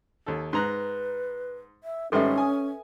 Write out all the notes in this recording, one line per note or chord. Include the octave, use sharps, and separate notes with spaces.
D#2 A4
G#2 B4 A#5 F#6
E5
G#1 G#2 G3 C#4 A4 B4 E5
G#5 D#6